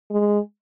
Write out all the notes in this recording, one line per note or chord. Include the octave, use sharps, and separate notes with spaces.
G#3